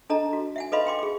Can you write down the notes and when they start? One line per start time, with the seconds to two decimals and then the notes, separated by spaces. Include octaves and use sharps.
0.10 D4 A4 D#5 A5 A#5
0.33 F#4
0.56 E5 F#5 G#5
0.72 A4 B4 D#5 F5 B5 C6
0.85 F5 G5 C6 D6
0.99 G#4 D6